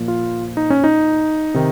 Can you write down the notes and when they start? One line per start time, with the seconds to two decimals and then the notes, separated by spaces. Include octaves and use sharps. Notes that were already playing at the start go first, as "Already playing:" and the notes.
Already playing: A#2 F3 A#3
0.08 F4
0.57 D#4
0.70 C#4
0.84 D#4
1.54 C3 D#3